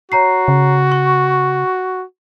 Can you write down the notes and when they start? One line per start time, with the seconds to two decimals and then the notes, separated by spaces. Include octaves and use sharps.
0.12 F#4 C#5 A#5 C7
0.48 C#3
0.92 C#6